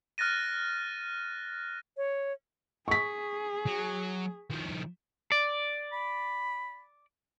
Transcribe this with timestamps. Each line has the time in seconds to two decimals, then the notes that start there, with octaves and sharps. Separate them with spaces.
0.18 F6 F#6 A6 A#6 D#7
1.97 C#5
2.88 G#4 C#6 B6
3.67 F#3
4.50 D#3 F3
5.32 D5
5.93 B5